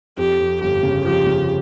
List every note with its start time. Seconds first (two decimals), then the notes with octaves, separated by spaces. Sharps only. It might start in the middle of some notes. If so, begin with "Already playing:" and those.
0.17 F2 G4
0.39 F2
0.61 G1 G4
0.83 C#3
1.05 F3 G4
1.27 C#3